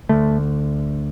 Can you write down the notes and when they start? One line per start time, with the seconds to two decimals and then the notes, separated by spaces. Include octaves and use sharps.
0.09 D2 D3 A3